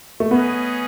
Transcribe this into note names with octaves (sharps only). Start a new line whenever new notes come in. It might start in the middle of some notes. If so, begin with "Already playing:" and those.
A3
B3 C#4 G#4 B4 D#5